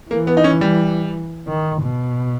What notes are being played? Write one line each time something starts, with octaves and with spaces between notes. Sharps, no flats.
E3 A#3
B3
D#4
C#4
G3
D#3
B2